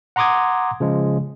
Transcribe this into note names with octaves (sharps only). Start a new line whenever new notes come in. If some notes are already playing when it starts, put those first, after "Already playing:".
F#5 A#5 C6 D6 D#6 G#6
C#3 F3 G#3